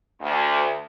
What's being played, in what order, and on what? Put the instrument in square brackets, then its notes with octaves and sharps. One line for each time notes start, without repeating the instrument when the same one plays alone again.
[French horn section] D2